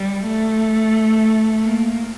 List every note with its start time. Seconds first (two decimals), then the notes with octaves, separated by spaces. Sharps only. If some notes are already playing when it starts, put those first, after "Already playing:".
Already playing: G3
0.26 A3
1.63 A#3